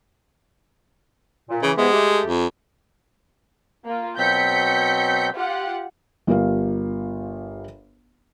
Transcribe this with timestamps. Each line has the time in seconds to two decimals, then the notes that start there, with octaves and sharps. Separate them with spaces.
1.49 A#2
1.63 C#3 E3
1.78 C3 E3 G#3 B3
1.93 A3 G4
2.25 F2
3.85 A#3 F4
4.18 B2 F#3 C4 G6 B6 C#7
5.35 F4 G4 F#5
6.27 G1 F4 G4 A#4 F5